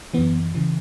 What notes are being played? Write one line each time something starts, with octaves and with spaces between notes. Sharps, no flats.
F#2 E3 B3
C#3 E3